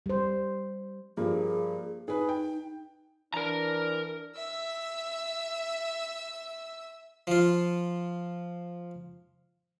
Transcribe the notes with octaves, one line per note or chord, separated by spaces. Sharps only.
G3 C5
G2 F3 A#3 G#4
D#4 G#4 B4
G5
E3 D4 A#4 A#5
E5 E6
F3 F4